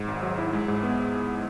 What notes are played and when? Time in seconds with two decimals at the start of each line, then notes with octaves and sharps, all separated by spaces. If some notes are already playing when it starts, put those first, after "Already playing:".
Already playing: G#2
0.08 G#1
0.23 F#3
0.38 E4
0.53 G#3
0.68 G#2
0.83 B3